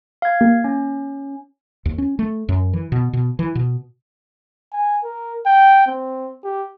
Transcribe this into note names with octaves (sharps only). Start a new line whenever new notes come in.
F5 G#6
A#3 G4
C#4
D#2
C#4
A3
F#2
E3
B2
B2
E3
B2
G#5
A#4
G5
C4
G4